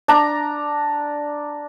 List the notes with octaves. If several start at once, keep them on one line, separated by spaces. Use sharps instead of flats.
D4 A#5